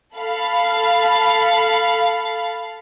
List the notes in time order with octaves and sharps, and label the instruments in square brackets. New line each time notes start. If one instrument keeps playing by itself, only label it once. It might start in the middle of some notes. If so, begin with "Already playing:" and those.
[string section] A4 F5 B5